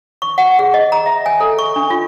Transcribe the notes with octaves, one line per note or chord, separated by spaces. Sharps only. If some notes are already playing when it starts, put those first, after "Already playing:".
C#6
F#5
G#4
D#5
A#5
E5
G#5
A4
C#6
D4
F4